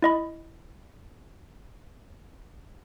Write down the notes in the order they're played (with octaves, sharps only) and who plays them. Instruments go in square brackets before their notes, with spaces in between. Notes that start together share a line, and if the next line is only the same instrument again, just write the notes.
[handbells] E4 D#5 B5